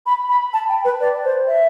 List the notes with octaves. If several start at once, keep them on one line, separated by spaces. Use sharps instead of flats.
B5
B5
A5
G5
B4
D5
C5
E5